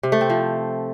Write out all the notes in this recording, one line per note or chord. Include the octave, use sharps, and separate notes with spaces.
C3
A3
C4
F3